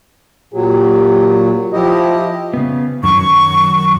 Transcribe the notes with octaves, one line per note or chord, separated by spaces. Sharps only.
A#2 F#3 G4
F3 E4 G4 D#5
C#3 B3
F#2 D#3 F#3 C#6